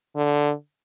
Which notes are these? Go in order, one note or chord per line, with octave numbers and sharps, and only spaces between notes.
D3